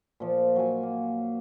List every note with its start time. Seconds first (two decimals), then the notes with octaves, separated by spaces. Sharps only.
0.20 A#2 F3
0.56 F#3 G#5
0.83 A#3